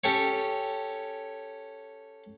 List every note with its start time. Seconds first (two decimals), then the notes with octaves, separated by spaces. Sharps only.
0.04 C#4 G4 A4 C#5